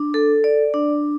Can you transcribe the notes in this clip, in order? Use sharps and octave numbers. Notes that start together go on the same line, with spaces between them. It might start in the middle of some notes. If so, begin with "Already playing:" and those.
Already playing: D4
A4
D5
D4